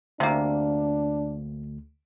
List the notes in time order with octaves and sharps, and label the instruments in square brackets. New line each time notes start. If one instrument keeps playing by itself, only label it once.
[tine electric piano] D2 [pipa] C3 A#3 [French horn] D4